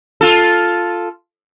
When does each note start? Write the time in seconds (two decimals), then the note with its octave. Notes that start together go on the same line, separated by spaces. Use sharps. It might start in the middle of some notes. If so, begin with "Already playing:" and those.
0.21 F4 A4